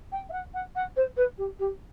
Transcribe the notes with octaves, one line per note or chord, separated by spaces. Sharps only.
G5
E5
F#5
F#5
F#5
C5
B4
G4
G4